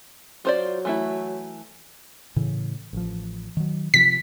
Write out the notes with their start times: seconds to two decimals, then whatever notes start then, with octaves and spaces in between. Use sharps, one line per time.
0.45 F#3 F4 C5 D5
0.85 E3 A3 E4
2.36 A2 C#3 E3
2.93 A1 F3
3.57 D#3 F#3
3.94 C3 F3 B6